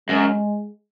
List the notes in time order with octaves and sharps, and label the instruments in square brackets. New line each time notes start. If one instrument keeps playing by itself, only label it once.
[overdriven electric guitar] F#2 [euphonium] G#3